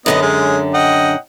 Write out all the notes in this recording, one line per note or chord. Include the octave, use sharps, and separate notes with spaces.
F#2 D3 B3 G4 D#5
G#3 C#4
D#5 F#5 G5